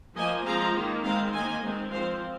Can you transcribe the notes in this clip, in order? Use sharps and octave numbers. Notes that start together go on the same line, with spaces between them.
F3 A#3 D#5 G#5
F3 G#3 C4 F5 A#5
D#3 A#3
D#3 G#3 C4 F5 A#5
D#3 A#3 D#5 G#5
D#3 G#3 C4
F3 C4 C5 F5